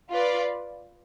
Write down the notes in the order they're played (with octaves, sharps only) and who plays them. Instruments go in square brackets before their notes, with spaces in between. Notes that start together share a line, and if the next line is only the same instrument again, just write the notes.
[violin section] F4 B4 D5